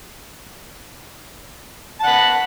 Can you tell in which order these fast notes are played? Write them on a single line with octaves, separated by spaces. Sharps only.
A5 F#5 B5